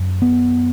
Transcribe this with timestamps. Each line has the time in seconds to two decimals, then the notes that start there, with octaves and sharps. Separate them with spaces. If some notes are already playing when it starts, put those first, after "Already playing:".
Already playing: F#2
0.22 B3